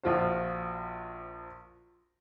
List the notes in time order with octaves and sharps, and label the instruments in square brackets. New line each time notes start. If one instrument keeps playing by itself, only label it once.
[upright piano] A#1 F3 F4 F#4 C5